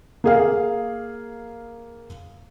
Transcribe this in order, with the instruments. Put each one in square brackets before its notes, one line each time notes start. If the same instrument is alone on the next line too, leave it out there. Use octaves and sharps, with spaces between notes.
[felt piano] A#3 G#4 F5